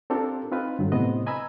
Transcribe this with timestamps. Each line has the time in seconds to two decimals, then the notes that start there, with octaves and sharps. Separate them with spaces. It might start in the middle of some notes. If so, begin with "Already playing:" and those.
0.10 C4 D4 F4 G4 A4 A#4
0.51 C4 D#4 F4 B4
0.79 G2 D3 F#3
0.92 A2 C3 B3 C5 D#5
1.26 D#5 G#5 A#5 B5 E6